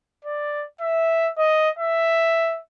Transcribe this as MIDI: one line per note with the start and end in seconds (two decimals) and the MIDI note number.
0.25 0.65 74
0.81 1.29 76
1.38 1.69 75
1.79 2.59 76